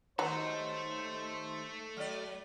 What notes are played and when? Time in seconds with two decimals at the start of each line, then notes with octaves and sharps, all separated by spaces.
0.19 D#2 F#3 A3 D#4 A4 C5
1.97 F#3 D5